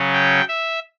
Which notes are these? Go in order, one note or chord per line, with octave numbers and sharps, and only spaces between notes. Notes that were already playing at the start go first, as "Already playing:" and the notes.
Already playing: C#3 F#3 C#4
G5
E5